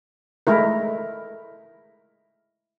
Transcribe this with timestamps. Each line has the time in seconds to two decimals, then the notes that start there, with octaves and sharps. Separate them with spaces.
0.47 G#3 A3 E4 A#4